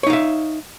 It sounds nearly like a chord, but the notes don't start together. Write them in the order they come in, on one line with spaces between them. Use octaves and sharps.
C#5 D#4 F5 E5